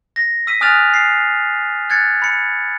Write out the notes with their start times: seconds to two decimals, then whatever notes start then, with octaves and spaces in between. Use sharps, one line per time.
0.16 A#6
0.47 E6 B6 D#7
0.61 G#5 D#6 F6 F#6 A6 F7
0.94 C7
1.90 F#6 G#6 A6 C#7
2.22 B5 C#7